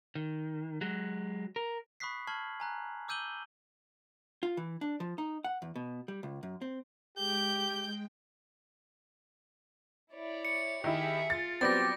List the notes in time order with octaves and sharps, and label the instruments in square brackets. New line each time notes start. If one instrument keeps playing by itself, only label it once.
[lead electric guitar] D#3
F#3 G#3
A#4
[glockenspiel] B5 C#6 D#6 F#6 B6 C7
A5 C#6 F6 G#6 C7 F#7
G#5 A#5 F#6
D6 E6 G6 D#7 F#7 G7
[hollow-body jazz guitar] F4
E3
D4
F3
D#4
F#5
E2
B2
G3
C#2
F#2
C4
[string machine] G#3 G5 [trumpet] G4 [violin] G6
[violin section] E4 C#5 D5
[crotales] C#7
[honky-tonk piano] D#3 E4 [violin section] G4 G#4 E5
[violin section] F4 [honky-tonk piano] A6
[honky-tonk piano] F#3 B3 C4 [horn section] G3 G4 D5 [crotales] A6 A#6